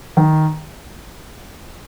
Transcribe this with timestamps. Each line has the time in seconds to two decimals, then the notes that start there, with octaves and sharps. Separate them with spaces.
0.17 D#3